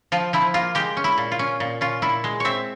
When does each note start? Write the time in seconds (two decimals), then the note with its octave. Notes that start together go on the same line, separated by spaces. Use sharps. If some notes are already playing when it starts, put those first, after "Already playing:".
0.12 F3 F4
0.33 F3 E4
0.54 A#3 F4
0.75 G#3 G4
0.97 C#4
1.04 E4
1.18 A#2
1.32 F4
1.39 C#4
1.60 A#2
1.81 C#4 F4
2.02 A#2 E4
2.24 G#3
2.40 C4 C#5 E5